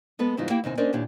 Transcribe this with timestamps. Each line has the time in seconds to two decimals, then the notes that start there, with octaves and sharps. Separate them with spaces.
0.19 G#3 B3 A4 B4
0.37 G#2 C#3 E3 G3 D#4 F4
0.50 A#3 E4 G4 F5 G5
0.64 D#2 C3 D#4 G#5
0.77 C#4 D4 A#4 C5 D5 D#5
0.93 D#2 A#2 D4 E4 G4 C#5